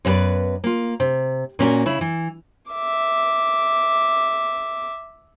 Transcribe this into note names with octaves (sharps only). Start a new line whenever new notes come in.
F#2 B3 F4 G#4 B4 D5
A#3 F4
C3
A#2 A#3 C#4 F#4 A4 A#4
C#3 E4
E3
E5 D6